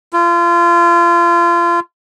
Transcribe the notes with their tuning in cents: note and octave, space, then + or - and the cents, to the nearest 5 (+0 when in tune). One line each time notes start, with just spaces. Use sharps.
F4 -30